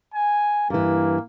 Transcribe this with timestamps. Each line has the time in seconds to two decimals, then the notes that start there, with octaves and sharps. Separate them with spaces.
0.14 G#5
0.70 G2 E3 A#3